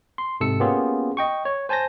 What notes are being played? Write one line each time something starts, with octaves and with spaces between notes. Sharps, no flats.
C6
G#2 C3 A4 E6 C#7
A#3 B3 C#4 F4 G4 G#4
D#5 G5 C#6
C#5
C5 G#5 A5 G6 A#6